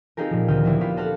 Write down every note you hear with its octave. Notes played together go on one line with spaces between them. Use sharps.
C4 D#4 F4 G4 G#4 A#4
A#2 F3
D2 D#3 G5 D#6 F6
E3 A#3 B3 D4 E4
F4 G4 C5 B5
F#4 A4 C5 F5 F#5